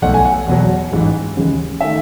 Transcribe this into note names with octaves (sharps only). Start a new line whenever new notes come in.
B1 B2 A3 F#5
G#5
F#5
E2 B2 F#3
A1 G#2 E3
D#2 C#3 E3 G#3
D#3 A3 E5